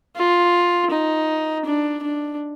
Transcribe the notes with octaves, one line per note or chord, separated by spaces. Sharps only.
F4
D#4
D4
D4